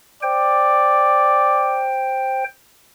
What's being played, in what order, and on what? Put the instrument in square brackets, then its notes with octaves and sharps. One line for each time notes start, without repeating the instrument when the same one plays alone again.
[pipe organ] C5 G5 [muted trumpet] D5